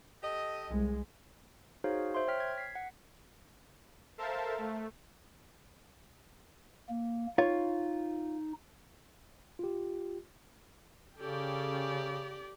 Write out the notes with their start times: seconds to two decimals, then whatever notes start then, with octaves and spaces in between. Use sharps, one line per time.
0.23 G4 A4 D#5
0.70 C2 G#3
1.84 D#4 F#4 G#4 C5 C#5 F5
2.15 C5 E5 C6
2.28 C#5 G5 F6 B6
2.40 G#6
2.58 B6 C7
2.75 F#5
4.18 A4 A#4 C5 E5 F5 A5
4.58 A3
6.89 A#3
7.38 D#4 F4 C#5
9.59 F4 G4
11.19 C#3 C#4 G4 A4 D5 G5